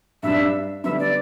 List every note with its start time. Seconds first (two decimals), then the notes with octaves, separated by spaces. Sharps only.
0.23 G2 G3 D4 E5
0.84 D3 G3 B3 E5
1.00 D5